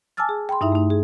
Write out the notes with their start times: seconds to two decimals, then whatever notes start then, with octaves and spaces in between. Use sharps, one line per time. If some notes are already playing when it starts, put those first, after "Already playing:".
0.17 G#5 A5 D6 E6 F6 A6
0.29 G#4
0.49 G5 B5 C6
0.61 G2 D#4 E4 E5
0.72 A3 D#4
0.90 G#4